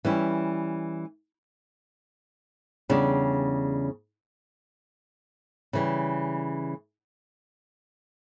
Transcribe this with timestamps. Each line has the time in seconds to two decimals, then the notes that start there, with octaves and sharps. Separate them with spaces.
0.05 E3 G3 C#4 E4
2.89 E2 C#3 G3 D4
5.73 C#3 E3 G3